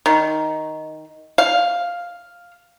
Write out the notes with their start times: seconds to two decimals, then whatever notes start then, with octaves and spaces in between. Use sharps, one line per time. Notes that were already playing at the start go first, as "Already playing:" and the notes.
0.06 D#3
1.38 F5